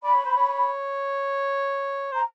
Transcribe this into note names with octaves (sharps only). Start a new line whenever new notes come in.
D5 B5
C#5
C5
C#5
C5 A#5